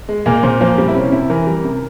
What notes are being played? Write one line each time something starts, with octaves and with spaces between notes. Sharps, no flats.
G#3
A#2 A#3
A#2 C4
F3 A#3
G3 C4
E4
C3 C#4
C3 E4
E3 A#4
G3
C3